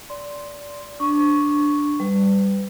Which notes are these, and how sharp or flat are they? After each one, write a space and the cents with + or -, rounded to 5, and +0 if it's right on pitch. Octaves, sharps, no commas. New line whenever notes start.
D5 -20 C6 +0
D4 +0 C#6 +0
G3 +0 B4 +25